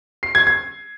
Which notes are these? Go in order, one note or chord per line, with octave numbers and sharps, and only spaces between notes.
C7
G#6
G#6